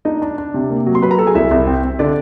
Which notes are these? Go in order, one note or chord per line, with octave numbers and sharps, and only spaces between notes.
D4 D#4 D#5
D4
D4
C3
A#3
F#3
C6
F#3 B4 B5
A#4 A#5
F#3 A4 A5
G#4 G#5
C2 E4 E5
C2
C4
C4
D3 D4 D5